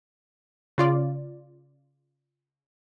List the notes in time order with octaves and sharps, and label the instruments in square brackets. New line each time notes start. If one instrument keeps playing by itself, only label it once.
[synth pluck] C#3 F4 D5